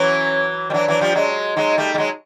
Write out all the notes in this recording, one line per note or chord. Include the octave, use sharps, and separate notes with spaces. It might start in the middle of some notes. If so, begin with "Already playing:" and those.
Already playing: E3 F#3 C#4
G3
E3 F#3 D4
E3 F#3
F3 G3
F#3 G#3
F#3 G#3 D#4
G3 A3
G3
F#3 G#3